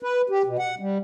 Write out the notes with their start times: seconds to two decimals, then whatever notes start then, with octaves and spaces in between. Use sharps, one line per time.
0.03 B4
0.30 G4
0.46 B2
0.59 F#5
0.79 G3